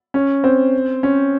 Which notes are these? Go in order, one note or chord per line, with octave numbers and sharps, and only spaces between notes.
C#4
C4
C#4